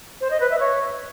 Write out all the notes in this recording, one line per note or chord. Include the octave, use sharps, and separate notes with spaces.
C5
D#5
B4
E5
C#5